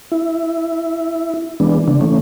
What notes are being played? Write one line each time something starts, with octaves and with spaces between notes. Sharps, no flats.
E4
E3 G#3 B3 D4
C#3 D4
E3 A3 C#4